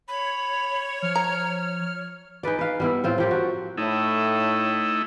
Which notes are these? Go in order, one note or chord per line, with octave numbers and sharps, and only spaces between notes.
C#5 B5
F3 F6
A#5
D#4 G#4 B4 D5
B4 F5
G3 B3 E4
A2 C4 F4
F3 G4 A#4
F#4
A2 A3 D#4 E4